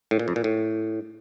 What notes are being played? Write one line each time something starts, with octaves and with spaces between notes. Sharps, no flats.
A2
A#2
F2
A#2
A2